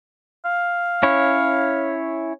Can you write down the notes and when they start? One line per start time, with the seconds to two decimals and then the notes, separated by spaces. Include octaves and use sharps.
0.45 F5
1.03 C#4 E4 C#5